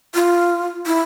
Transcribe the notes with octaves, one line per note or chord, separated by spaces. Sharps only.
F4
E4